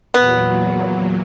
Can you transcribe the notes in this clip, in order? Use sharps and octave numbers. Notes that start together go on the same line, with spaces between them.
E2 A#2 F#3 B3